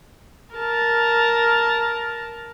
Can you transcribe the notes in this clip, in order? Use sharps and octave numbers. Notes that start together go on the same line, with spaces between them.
A#4 A5